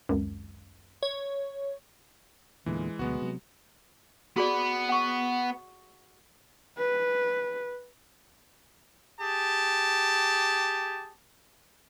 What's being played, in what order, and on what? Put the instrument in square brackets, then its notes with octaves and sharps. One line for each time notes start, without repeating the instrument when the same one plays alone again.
[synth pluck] G#1 C#2 F#2
[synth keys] C#5
[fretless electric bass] E2 A#2 D3 [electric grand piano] E3 G#3
[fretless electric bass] D2 B2 F#3 [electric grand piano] G#3 B3 F#4
[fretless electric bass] C3 F#3
[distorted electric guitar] B3 B5 [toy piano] F#4 G#4 D5
[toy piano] F#5 C#6
[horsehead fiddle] B4
[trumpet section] G4 G#4 A5